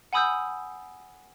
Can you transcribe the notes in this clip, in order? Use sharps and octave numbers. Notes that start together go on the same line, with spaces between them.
F#5 G#5 B5 D#6 E6 G6